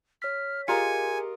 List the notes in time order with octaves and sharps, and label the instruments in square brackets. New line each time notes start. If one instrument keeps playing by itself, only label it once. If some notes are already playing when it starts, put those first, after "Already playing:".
[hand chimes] C#5 B6 [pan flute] F6
[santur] F4 A#4 D#5 [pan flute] G4 [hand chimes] G#4 C#7 [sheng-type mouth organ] G#5